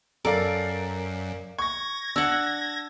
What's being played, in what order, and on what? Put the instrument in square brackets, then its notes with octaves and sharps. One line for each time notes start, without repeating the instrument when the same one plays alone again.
[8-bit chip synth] F#2 [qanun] A4 [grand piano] A#4 D5 F5
[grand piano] C#6 [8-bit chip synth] G#6 A#6
[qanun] D4 F#5 [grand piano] E6